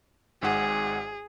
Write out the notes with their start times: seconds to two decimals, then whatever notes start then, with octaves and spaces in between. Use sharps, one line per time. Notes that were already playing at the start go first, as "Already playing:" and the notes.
0.42 G#1 G#2 G#4 F#5